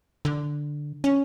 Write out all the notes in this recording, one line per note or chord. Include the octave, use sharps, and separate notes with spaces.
D3
C#4